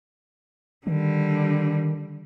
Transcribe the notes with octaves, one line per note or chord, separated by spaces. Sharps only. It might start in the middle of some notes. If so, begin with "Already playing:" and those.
D3 D#3 G3